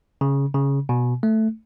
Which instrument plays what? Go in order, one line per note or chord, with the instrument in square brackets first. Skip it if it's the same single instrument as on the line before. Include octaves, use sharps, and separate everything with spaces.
[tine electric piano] C#3
C#3
B2
A3